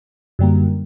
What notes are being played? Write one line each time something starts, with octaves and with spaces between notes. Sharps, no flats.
F#2 D3 G3 A#3